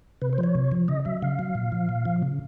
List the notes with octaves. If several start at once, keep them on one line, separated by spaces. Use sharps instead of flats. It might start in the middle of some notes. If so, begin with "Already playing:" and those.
C3 B4
C5
F3
C#5
C3
F3
C#3 D#5
F#3 E5
C#3 F5
F#3
A#2
F3
A#2
F3
C#3